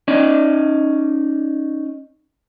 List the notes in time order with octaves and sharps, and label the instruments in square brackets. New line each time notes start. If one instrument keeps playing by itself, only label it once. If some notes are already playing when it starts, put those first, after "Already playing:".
[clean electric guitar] C#4 D#4 D5